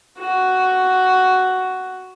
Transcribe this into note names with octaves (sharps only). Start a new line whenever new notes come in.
F#4